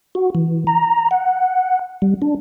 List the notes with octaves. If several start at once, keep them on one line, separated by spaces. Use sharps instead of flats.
F#4
E3
A#5
F#5
G3
D4